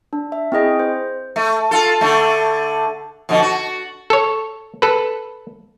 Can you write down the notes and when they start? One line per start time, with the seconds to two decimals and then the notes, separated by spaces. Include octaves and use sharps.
0.13 D4
0.32 E5
0.52 C4 E4 G#4 D#5 G5
0.79 C5
1.36 A3
1.71 F4 A4
2.01 D3 A3
3.29 F2 B2 D3
3.42 F#4
4.10 A4 C#5
4.82 A4 B4